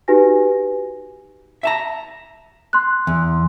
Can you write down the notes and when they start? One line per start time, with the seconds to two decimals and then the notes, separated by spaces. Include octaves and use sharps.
0.08 D#4 F#4 G4 B4 G#5 A#6
1.63 E5 A5 A#5
2.73 C6 F#6
3.07 E2